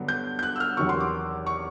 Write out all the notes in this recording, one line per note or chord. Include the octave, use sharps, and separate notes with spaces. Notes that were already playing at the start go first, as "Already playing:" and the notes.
Already playing: G2 D3 F#3 B3
G6
G6
F#6
E6
F6
E2 C3 D#3 F#3 C#6
C6
D6
C#6